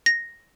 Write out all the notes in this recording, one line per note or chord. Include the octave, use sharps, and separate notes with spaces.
A#6